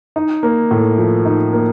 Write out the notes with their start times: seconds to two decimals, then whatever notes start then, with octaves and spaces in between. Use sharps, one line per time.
0.16 D#4
0.43 A#3
0.71 A2
0.98 F3
1.25 D#4
1.53 A#3